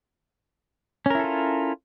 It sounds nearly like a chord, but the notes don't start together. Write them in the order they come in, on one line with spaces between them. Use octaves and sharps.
C#4 A#4 E4 A4 F4